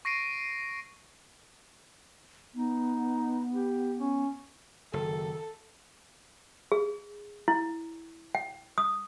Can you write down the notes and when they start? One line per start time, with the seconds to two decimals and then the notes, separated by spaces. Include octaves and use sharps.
0.05 C#6 A#6 C7 D7 D#7
2.55 B3 D#4
3.54 G4
3.99 C#4
4.93 F#1 D#3 A4
6.72 G#4
7.48 E4
8.35 G5
8.78 D#6